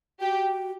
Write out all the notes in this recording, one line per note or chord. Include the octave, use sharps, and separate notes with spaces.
F#4 G4